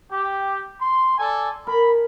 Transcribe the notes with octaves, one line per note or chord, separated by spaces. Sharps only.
G4
C6
A4 D5 G#5
A#4 B5